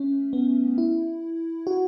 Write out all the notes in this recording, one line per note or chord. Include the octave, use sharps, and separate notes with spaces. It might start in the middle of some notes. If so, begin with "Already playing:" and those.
Already playing: A3 C#4
B3
E4
F#4